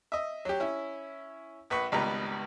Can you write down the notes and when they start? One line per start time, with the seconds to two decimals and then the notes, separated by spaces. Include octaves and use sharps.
0.12 D#5 E5
0.45 F#3 G4
0.60 C#4 E4
1.70 A#1 B4 C#6
1.92 G#1 C#2 G3 B3 B4 A#5